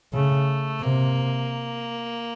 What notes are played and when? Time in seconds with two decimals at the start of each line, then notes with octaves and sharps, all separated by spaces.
0.13 C#3 A3
0.82 C3 A#3